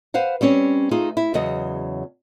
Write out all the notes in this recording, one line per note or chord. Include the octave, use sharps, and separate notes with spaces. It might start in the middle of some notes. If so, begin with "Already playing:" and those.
B4 C5 F5 F#5
G3 C4 C#4 C#5
A3 D#4 F4 G#4
E4
E2 C#3 F#3 D#5